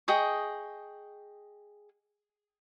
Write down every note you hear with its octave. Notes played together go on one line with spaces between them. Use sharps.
G#4 D#5 G5 C#6